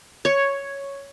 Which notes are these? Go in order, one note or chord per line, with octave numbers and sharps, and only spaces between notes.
C#5